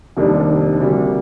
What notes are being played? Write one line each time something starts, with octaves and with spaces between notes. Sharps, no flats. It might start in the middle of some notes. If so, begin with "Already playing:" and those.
F1 D#2 D#3 G3 D4
D2 C3 G3 A#3